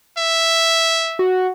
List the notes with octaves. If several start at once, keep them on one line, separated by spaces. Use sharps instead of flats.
E5
F#4